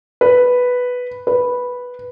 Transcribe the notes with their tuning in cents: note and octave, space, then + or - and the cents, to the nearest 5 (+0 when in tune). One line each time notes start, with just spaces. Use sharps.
B4 +0
B4 -5